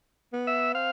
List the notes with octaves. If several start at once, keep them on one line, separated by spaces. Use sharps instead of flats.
B3
E5
C4 F5